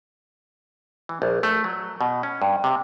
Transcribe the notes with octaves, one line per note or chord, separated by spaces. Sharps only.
E3
A#1
A3
F#3
B2
C#4
G2
C3